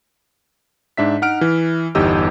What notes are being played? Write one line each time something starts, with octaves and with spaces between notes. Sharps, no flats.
G#2 D4 E5 B6
D#4 F#5 F6 D7
E3
G1 E2 D#4 G4 D#5 E6